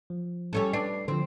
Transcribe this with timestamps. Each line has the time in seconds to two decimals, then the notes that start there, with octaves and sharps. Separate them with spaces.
0.10 F3
0.53 G3 C#4 A4
0.73 D4 B4 D5 C7
1.08 D3 F3 C4